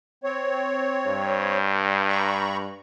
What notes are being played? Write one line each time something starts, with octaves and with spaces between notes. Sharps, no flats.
C4 C#5
G2
A#5 B5 C#6